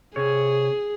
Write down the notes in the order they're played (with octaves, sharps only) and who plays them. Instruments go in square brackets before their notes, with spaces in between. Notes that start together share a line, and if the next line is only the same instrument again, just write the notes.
[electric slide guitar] C3 C#5 [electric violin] G#4